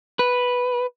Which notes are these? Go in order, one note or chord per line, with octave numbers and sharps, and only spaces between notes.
B4